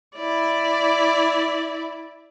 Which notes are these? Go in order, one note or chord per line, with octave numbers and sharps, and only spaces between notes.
E4 D5